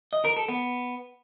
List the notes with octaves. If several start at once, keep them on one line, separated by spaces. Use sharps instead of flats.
D#5
A#4
A4
B3